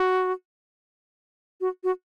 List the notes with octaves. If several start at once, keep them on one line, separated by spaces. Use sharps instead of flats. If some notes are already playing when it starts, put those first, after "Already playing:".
Already playing: F#4
F#4
F#4